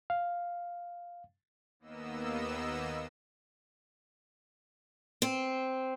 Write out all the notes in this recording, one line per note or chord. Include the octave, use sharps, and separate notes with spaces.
F5
D#2 A#3 B3 D#5 E6
C4